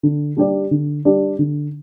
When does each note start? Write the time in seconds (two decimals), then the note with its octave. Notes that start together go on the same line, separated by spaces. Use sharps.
0.03 D3
0.37 G3 D4 G4 D5
0.71 D3
1.05 G3 D4 G4 D5
1.39 D3